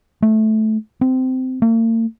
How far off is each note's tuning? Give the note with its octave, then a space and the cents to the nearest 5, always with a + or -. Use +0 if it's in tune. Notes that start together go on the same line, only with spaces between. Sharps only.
A3 -15
C4 -20
A#3 -45